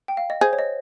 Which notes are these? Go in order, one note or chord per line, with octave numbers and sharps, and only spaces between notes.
G5
F5
D#5
G#4 C5
C#5
D#5